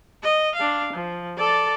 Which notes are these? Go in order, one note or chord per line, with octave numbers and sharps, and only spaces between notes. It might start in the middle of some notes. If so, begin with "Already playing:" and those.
D#5
D4 F5
F3
A4 D5